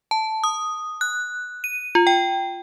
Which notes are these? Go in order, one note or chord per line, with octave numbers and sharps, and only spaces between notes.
A5
D#6
F#6
D#7
F4
G5